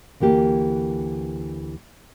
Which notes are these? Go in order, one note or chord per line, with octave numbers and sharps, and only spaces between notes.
D2 E3 A#3 G4